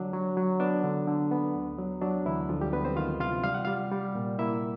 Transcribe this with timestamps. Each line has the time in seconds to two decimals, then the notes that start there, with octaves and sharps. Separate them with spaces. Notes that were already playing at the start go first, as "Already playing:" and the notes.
Already playing: D3 F#3 D4
0.13 F#3
0.37 F#3
0.60 B3 D4
0.84 D3
1.07 D3
1.31 B3
1.55 D2
1.78 F#3
2.02 F#3 D4
2.26 D2 E3 E4
2.49 D2 F3 F4
2.61 G3 G4
2.73 D2 B3 B4
2.85 C4 C5
2.97 D#3 F4 F5
3.20 C3 F4 F5
3.44 G3 F5
3.54 F#5
3.65 G3 F4 F5
3.91 G3
4.15 A#2
4.39 A#3 E4 E5